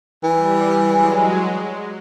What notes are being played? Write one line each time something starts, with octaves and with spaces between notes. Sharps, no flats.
E3 G3
F#3 G#3